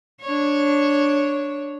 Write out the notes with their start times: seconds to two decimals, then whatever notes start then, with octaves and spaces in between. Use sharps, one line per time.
0.21 D4 C#5